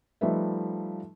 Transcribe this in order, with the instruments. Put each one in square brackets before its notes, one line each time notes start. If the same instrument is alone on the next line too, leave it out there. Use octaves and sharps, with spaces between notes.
[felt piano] F3 G3 A3 D#4 B4 E5